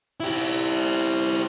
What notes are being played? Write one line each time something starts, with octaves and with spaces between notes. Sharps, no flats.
E4 G4